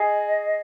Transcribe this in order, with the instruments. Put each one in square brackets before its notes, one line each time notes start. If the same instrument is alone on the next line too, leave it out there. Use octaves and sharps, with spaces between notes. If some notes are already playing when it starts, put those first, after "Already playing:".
Already playing: [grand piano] G#4 [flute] D#5